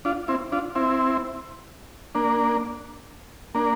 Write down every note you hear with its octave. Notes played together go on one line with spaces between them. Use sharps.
D4 F4
C4 E4
D4 F4
C4 E4
A#3 D4
A#3 D4